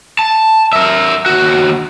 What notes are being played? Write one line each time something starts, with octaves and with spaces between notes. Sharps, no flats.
A5
A#4 E5
D#2 F#4